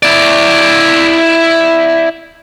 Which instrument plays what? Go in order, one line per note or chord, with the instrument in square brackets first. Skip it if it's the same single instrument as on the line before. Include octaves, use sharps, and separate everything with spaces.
[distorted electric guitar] E4 D5